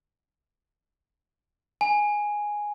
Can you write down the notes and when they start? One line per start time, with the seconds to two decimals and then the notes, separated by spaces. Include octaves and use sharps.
1.81 G#5